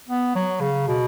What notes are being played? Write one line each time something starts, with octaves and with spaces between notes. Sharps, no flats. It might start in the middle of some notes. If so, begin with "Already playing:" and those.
B3
F#3
C#3
B2